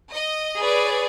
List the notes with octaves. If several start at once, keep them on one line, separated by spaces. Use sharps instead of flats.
D#5
G#4 B4 C#5 D5